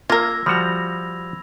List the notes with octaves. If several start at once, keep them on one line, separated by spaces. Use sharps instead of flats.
A#3 F4 A#4 E6 G#6 A#6
F3 G3 F#4 B5 F7